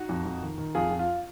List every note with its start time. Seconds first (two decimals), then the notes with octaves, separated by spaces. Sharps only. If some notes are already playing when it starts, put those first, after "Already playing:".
Already playing: D#4 F#4
0.09 F2
0.25 F2
0.42 D#3
0.58 D#3
0.75 F2 F4 G#4
0.91 F2
0.99 F4